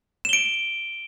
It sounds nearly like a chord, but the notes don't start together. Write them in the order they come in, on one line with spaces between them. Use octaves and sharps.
E7 G7 D7